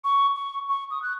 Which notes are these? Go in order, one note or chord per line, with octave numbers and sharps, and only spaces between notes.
C#6
C#6
C#6
D#6
F#6